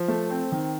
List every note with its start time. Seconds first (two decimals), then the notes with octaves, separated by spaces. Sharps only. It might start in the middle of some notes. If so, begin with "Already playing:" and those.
Already playing: F3
0.08 A3
0.30 C4
0.52 D#3